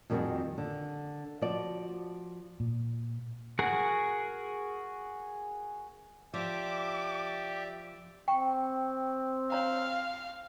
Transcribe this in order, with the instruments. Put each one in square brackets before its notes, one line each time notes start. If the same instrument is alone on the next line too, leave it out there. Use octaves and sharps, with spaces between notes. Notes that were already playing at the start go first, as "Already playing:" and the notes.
[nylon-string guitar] F2 D#3 G3 C#4 F#4 G#4
D3
F3 F#4 D5
[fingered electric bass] A#2
[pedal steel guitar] F#4 G#4 A#4 F#5
[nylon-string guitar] F3 [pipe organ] G4 [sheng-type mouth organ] D5 E5 [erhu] D6
[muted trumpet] C4 [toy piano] G5 C#6
[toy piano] C#5 A#5 [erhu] F5